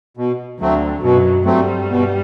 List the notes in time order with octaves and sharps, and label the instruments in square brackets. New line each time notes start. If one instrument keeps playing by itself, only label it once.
[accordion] B2
[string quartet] D2 D3 [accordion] F#3 A3 C4
[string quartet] F#2 F#3 [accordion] B2
[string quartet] G2 G3 [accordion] F#3 A3 C4
[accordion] B2